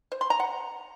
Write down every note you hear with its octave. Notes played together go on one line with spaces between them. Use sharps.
C5
C6
A#5
F#5